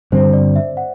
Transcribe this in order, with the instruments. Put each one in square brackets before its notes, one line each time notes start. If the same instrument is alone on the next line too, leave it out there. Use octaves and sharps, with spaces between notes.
[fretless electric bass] G2 D3 G3 C4 [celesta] C5
[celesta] D5
E5
F#5